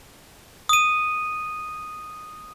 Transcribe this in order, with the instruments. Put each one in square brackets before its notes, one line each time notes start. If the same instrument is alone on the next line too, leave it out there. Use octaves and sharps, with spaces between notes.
[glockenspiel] D#6 D#7